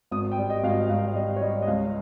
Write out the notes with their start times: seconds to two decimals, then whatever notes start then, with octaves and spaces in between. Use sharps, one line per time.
0.11 G#1 D#6
0.32 G5
0.38 G3
0.50 D#5
0.63 G#1 F5
0.70 D#5
0.89 G#1 F5
1.16 G3 D#5
1.36 C#5
1.41 G3 D#5
1.62 D#5
1.67 C#2 F5